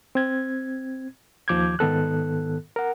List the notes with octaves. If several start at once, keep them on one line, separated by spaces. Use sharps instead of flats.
C4 G#6
D#2 D#3 F3 D6 G6 G#6
G#2 D#3 B3 A4 F#6
A#4 F#5